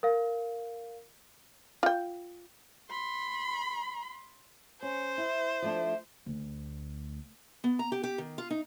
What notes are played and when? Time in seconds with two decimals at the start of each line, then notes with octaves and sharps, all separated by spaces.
0.03 A#4 F5
1.83 F4 G5
2.90 B5 C6
4.82 C#4 C5
5.18 E4
5.62 F3 A3 D4
6.26 D2
7.64 B3
7.79 A#5
7.92 G4
8.03 G4
8.18 D#3
8.38 F4
8.50 D#4